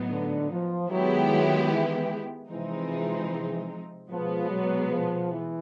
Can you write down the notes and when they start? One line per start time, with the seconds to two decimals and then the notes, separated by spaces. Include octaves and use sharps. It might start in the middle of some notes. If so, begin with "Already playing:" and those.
Already playing: A2 F#3 B3 D#4
0.10 D3
0.50 F3
0.90 D#3 F#3 G#3 B3 E4 G4
1.30 F#3
1.70 E3
2.50 C3 E3 F3 G#3 C4 D#4
4.10 B2 F3 G#3 B3
4.50 F#3
4.90 F3
5.30 E3